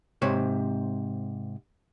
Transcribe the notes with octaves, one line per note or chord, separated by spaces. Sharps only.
G#2 C3 C5 C#5